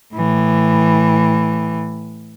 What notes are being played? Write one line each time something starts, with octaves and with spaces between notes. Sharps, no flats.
A2 E3